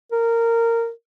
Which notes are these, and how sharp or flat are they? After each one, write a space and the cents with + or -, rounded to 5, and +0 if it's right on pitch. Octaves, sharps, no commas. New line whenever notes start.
A#4 -15